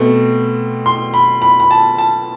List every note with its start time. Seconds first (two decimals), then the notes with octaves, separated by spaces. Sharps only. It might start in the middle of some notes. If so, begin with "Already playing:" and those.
Already playing: B2 A3 C4
0.86 C6
1.14 B5
1.42 B5
1.60 B5
1.71 A5
1.98 A5